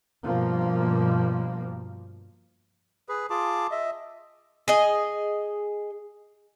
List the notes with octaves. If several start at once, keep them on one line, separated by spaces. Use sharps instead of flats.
G2 B2 F3 A#3
G#4 B4
F4 G#4 A5 D6
D#5 E5
G#4 D#5